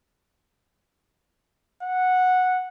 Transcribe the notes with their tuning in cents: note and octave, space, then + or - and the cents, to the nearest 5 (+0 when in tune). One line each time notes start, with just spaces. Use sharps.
F#5 -10